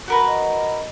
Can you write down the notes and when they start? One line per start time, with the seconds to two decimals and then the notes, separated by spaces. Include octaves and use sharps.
0.08 F#4 A#4 B4
0.28 D#5